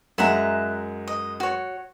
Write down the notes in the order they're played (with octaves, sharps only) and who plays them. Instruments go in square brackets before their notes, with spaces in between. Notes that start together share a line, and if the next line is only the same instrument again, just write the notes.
[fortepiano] F#2 G#3 [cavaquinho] E5 F#5 A#5
[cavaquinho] D#5
F#4 C#5